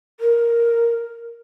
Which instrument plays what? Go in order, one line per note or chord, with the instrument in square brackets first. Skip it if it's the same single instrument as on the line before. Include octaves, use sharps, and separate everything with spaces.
[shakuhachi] A#4